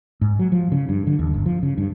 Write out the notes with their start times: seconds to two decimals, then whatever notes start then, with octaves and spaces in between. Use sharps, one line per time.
0.21 G#2
0.39 F#3
0.52 F3
0.72 C#3
0.89 G2
1.07 D3
1.19 D#2
1.34 G1
1.46 F3
1.63 C#3
1.78 G2